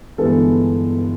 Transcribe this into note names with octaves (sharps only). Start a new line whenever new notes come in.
G1 G2 E3 G#3 B3 A4